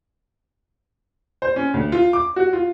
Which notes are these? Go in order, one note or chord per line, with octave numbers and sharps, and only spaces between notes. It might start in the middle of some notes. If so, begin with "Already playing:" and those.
C5
C#4
D2
F4
D6
F#4
F4